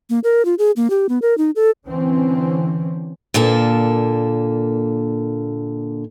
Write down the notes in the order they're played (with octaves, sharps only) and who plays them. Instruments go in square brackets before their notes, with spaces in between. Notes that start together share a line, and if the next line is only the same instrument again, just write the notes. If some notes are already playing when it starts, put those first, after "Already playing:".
[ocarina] A#3
A#4
F4
G#4
A#3
G4
B3
A#4
D#4
A4
[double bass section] D3 E3 C4 C#4
[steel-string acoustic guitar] A#2 D3 A#3 A4